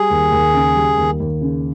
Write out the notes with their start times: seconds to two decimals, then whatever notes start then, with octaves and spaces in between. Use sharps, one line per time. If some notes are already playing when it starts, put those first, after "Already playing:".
Already playing: G3 G#4
0.10 D#2
0.32 D#2
0.54 C#3
0.76 G3
0.97 D#2
1.20 D#2
1.41 C#3